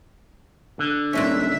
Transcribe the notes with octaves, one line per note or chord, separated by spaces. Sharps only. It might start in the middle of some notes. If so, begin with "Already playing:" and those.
D3
D#1 A#2 G#3 C#4 E5